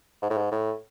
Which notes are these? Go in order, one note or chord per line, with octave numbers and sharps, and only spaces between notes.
G#2
A2
G#2
A2